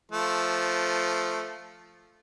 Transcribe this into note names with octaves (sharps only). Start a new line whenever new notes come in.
F3 A3